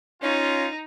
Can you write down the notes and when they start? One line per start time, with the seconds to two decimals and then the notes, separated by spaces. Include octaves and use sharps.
0.22 C#4 D#4 F4